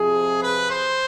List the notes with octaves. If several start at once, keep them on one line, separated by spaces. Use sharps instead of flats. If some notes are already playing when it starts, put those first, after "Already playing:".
Already playing: F2 C3 F3 G#4
B4
C5